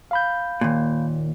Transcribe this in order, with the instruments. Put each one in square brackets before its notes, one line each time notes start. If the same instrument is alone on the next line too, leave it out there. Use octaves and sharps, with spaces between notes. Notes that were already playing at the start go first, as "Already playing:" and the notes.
[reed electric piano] F5 B5 G6
[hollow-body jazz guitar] D#2 A#2